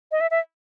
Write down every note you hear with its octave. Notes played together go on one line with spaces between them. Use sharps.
D#5
E5
E5